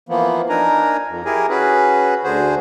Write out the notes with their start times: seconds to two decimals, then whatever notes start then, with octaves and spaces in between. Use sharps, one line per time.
0.09 E3 F3 A#3 B3
0.49 D4 D#4 A#4 G#5 A#5
1.07 F2
1.25 E4 G4 G#4 A#4 G#5
1.49 C#4 F#4 G#4 B4
2.24 D2 D3 F#4 G#4 C5